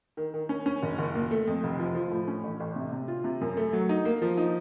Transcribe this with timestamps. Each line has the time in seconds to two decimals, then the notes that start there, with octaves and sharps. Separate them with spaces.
0.17 D#3
0.34 D#3
0.49 C#4
0.66 C#4
0.83 F#1
0.99 F#1
1.15 A#2
1.31 A3
1.47 F2
1.63 F1
1.79 F3
1.95 F3
2.12 A2
2.28 C#4
2.44 A1
2.60 A1
2.76 C3
2.92 C3
3.08 F4
3.24 C3
3.41 F#2
3.57 A3
3.73 F#3
3.89 D#4
4.05 A#3
4.22 F3
4.37 D#4